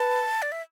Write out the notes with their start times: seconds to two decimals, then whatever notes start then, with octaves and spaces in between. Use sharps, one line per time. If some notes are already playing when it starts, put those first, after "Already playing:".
Already playing: B4 A5
0.42 D5
0.52 E5